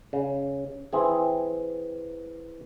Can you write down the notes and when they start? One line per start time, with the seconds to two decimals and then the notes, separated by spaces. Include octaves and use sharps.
0.13 C#3
0.93 E3 C4 G#4